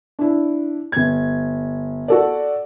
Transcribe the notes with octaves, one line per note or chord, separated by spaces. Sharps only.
D4 E4
G1 G#6
F#4 A4 D5